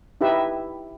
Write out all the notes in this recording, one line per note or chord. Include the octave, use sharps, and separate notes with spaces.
D#4 E4 G4 B4 E5